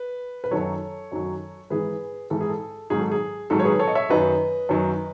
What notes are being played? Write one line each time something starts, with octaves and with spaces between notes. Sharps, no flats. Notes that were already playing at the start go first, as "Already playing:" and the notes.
Already playing: B4
B4
F#2 D#3 F#3 A4 C#5
F#2 D#3 F#3
G#2 E3 G#4 B4
G#2 E3 A4
G#4
A4
G#2 D#3 F#3 G#4
A4
G#4
G#2 D#3 F#3 A4
C#5
G#4 B4
A4 C#5
D#5
C#5 E5
F#2 D#3 F#3 B4 D#5
F#2 D#3 F#3